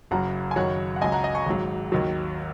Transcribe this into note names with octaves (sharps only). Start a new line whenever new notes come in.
F#1 F#2 F#3 F#5 A#5
G#5
F#1 F#2 D#3 F#3 C#5 F#5
F#5
C#2 C#3 F#3 D#5 G#5
F#5 A#5
D#5
G#5 C#6
G#1 G#2 F#3
D#2 D#3 F#3